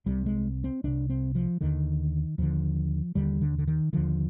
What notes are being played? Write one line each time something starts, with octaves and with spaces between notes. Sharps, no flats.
C2 C3 G3
G#3
C4
C2 C3 D4
C4
F3
D#2 D3 D#3
D#2 D3 F3
D#2 D3 G3
D3
D3
D#3
D#2 D3 F3